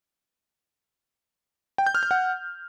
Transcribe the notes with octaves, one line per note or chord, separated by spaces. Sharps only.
G5
G6
F6
G6
F#5